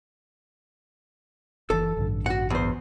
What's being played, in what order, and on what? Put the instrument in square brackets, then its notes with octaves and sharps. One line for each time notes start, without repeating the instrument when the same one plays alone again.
[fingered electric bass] F#1 E3 [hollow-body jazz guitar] A4
[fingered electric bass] A1 G2 D3
[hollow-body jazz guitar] F#4 F#5
E2 C5